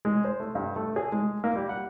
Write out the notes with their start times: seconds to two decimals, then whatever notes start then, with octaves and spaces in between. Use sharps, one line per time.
0.05 G#3
0.25 C5
0.40 A3
0.55 G2
0.76 A3
0.96 G#4
1.12 G#3
1.44 A#3
1.56 G3
1.69 F#5